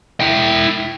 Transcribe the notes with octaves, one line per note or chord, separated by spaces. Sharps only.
E4 G5